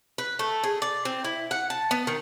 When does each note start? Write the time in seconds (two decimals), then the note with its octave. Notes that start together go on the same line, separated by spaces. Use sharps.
0.18 B4
0.39 A3
0.64 G#4
0.82 D5
1.05 C4
1.24 E4
1.51 F#5
1.70 A5
1.91 B3
2.07 D#3